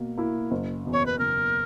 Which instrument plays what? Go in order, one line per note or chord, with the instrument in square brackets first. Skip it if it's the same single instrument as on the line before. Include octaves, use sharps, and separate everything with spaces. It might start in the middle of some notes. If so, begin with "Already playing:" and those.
Already playing: [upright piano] B2 A#3
A#3 E4
F#1
E2 B2
[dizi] C#5
B4
[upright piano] F#1 [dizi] A#4